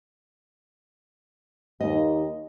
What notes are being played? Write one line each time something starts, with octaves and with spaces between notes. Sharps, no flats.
D#2 D#5